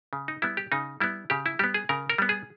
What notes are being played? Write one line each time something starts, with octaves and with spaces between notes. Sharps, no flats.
C#3
D#4
G3 B3 E4
G4
C#3 D#4
G3 B3 E4
C#3 G4
E4
G3 B3 G4
G#4
C#3 A#4
A#4
G3 B3
G#4